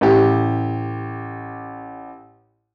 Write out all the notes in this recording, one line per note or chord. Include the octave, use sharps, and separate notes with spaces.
A1 G4